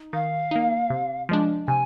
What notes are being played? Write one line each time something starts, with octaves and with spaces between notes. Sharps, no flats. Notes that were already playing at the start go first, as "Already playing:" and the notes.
Already playing: D#4
D#3 F5
A#3 D#4
C3
F3 G#3 D4
C3 G#5